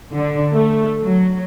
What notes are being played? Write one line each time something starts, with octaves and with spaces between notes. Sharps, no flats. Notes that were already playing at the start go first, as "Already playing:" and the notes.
D3
A3
F#3